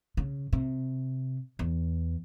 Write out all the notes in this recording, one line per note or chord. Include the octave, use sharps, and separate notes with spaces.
C#3
C3
E2